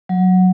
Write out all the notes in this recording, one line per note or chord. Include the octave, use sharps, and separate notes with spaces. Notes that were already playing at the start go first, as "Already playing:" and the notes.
F#3